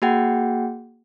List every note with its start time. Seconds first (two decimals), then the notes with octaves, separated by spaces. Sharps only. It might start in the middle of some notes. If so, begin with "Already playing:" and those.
0.02 A#3 F#4 G#4 F#5 G5